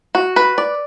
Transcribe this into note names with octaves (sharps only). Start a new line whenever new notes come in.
F#4
B4
D5